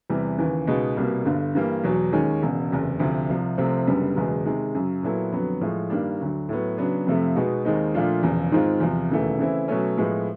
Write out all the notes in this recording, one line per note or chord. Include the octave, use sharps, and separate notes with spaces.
E2 C3 E3 G3
D#2 C#3 E3
C#2 B2 G#3 B3 D#4
C2 B2 G3 A#3
G1 G2 D3
G2 E3 G3 A#3
E2 B2 F#3
D#2 D#3 G#3 C#4
E1 E2 C#3
F#1 E2 C3
D2 C3 F3
C2 C3 F3
C2 C3 F3 A3 C4
F#1 F#2 D3 G3 B3
F#1 E2 B2 G#3
C3 D#3 G#3
F#2 C#3 F#3
A#2 F#3 B3 E4 A4
F2 D3 F#3 B3
A2 F3 G#3
G2 D#3 G3 A#3 D4
D2 D3 F#3
A2 F#3 B3
C#3 F#3 B3 D4
F2 C3 F3 A3
B2 G#3 B3 D#4 F#4
D#2 D#3 G#3 C4 D#4
A#2 F3 A3 D4 F4
E1 E2 C#3 F3
G#2 D#3 G#3 C4 F4
E2 C3 F3
E1 D#2 C#3 E3 A3
C#3 E3 A3 C4 E4
B2 F#3 A3 C#4
A2 F3 G#3 B3